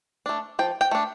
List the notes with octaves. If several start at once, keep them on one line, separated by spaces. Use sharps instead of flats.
A3 D4
F3 G5
G5
A3 D4